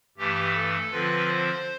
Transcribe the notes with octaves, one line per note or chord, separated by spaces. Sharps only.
G2 E3 A3 G4
A4
D3 F3 C4 F4 B4
C5